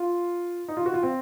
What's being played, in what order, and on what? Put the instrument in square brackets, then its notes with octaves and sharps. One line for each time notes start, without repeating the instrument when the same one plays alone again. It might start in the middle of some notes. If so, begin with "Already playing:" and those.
Already playing: [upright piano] F4
D#4
F4
F#4
F4
C4